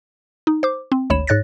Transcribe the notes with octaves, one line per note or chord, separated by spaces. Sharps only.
D#4
C5 D6
C4
G#1 D2 C#5 B5 E7
G#2 C#5 F#6 A6 A#6